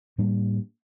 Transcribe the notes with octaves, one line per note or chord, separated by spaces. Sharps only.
A2 G3 A#3 D4